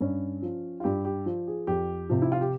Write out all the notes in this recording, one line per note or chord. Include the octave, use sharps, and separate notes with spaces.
G2 C#4
F3
F4
G2 G4
G4
F3
G#4
F2 G4
C3 F3
E4
F4
G4